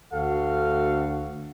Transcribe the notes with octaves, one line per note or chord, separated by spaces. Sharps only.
D2 F#4 A4 F5